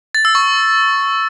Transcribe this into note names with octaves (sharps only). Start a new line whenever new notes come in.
A6
E6
C#6